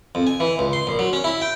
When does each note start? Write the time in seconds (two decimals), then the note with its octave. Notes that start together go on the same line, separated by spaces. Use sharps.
0.15 F2
0.27 G#5
0.40 E3
0.59 C#2
0.73 C6
0.87 A#1
0.99 F#3
1.13 C#4
1.24 E4
1.41 G5